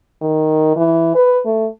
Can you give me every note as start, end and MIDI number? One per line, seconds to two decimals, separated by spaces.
0.22 0.73 51
0.76 1.15 52
1.16 1.39 71
1.45 1.68 57